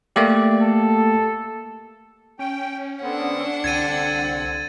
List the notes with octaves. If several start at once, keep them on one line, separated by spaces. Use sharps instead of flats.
A3 A#3 G4 D5
A4
C#4 G5
D3 B3 C4 D4 F#5
C2 D3 C4 G#6 A6 D#7